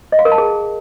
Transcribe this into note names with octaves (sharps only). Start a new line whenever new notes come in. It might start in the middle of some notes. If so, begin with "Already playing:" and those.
D#5
F5
A#4
A5
G#4